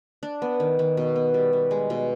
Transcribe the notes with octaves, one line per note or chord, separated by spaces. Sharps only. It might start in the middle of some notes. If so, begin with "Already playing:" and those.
D4
B3
D#3
D#3
B2
B3
G3
G3
G#3
B2